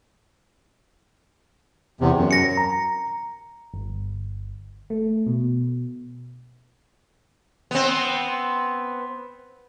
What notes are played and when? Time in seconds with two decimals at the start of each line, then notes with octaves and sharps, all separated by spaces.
2.01 E2 C3
2.17 F#2
2.31 A#6 C#7
2.57 A#5
3.74 G1
4.90 A3
5.27 B2
7.71 B3 C4